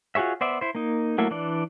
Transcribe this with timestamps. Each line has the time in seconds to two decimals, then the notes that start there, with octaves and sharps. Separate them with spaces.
0.15 F4 F#4 G#4 C#5 E5
0.41 B3 C5 D5 E5
0.61 E4 C5
0.75 A#3 D#4
1.18 F#3 A3 A#3 E4 A4
1.31 E3 D4 D5